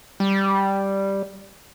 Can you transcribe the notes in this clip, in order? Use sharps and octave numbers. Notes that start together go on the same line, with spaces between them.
G3